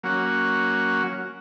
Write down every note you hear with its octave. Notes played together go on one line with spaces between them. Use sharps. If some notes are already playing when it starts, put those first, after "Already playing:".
F#3 A#3 C#4 F#4